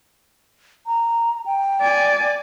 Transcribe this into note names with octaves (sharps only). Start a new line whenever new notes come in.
A#5
G5
D5 G#5